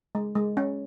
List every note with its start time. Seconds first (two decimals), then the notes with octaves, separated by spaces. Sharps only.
0.15 G#3
0.35 G#3
0.57 C#4